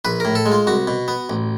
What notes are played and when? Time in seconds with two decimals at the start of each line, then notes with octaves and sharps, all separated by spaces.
0.05 A#1 B4
0.20 A2 A#4
0.35 A4
0.46 G#3
0.52 F4
0.67 C2 F#4
0.88 B2
1.08 B3
1.30 A1